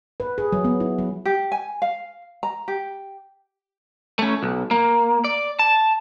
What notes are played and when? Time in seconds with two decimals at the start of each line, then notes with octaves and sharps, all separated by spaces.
0.20 B4
0.38 G#4
0.52 F#3
0.64 B3
0.80 E4
0.98 F#3
1.25 G4
1.52 G#5
1.82 F5
2.43 A#5
2.68 G4
4.19 A3 C#4
4.43 B1
4.71 A#3
5.24 D5
5.59 A5